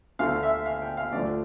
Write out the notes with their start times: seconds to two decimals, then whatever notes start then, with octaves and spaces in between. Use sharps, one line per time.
0.19 D2 D3 A3 F5
0.43 E5
0.66 F5
0.82 G5
0.97 F5
1.13 D2 D3 F3 A3 D5